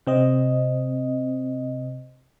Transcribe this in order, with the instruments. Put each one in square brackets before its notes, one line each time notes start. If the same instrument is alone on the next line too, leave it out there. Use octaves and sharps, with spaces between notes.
[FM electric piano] C3 C4 D#5